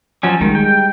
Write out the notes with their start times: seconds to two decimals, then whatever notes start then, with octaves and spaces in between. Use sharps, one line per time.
0.23 F3 F#3 C#4
0.41 D#3 G3 G#3
0.55 G5